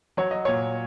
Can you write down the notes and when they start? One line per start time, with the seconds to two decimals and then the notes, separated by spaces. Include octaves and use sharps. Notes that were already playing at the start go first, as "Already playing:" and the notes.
0.17 F#3 C#5
0.31 D#5
0.45 A#2 C#5